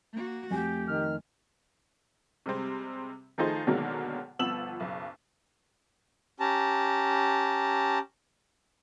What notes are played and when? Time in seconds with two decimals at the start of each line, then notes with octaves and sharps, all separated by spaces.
0.13 A#3 F#4
0.50 F2 A3 G4 G#5
0.88 D#3 F6
2.46 C3 G3 G#3 C4
3.38 D#3 F3 A3 D#4 G#4 C5
3.67 B2 D3 D#3 F#3 G#3 A#3
4.39 G1 F3 B3 E6 E7 F#7
4.80 F#1 B1
6.40 C#4 G4 A5 A#5